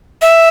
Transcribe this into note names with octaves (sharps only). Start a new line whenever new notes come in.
E5